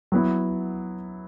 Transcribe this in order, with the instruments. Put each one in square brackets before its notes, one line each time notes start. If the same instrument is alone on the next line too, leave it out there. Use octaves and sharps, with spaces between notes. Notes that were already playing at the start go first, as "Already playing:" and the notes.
[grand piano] F#3 B3 E4